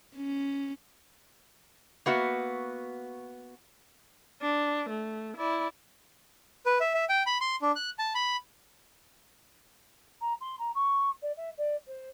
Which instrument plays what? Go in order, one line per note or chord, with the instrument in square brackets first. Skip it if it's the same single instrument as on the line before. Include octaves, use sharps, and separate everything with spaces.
[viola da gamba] C#4
[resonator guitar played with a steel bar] A#3 B3 F#4 E5
[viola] D4
A3
E4 D5
[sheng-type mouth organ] B4
E5
E5
G5
B5
C6
D4
F#6
A5
B5
[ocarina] A#5
C6
A#5
C#6
D5
E5
D5
C5